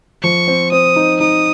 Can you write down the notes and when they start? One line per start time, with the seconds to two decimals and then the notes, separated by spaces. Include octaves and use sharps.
0.23 F3 C#6
0.47 C4
0.72 C4 D#6
0.96 D#4
1.20 D#4 D#6